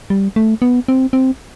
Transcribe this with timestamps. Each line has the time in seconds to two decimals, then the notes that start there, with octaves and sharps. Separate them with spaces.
0.10 G3
0.36 A3
0.62 B3
0.88 C4
1.13 C4